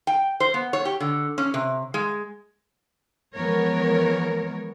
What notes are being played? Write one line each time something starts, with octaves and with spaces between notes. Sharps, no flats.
G5
C5
B3
C#5
G4
D3
C#4
C3
G#3
E3 F3 G#3 B3 A#4 C#5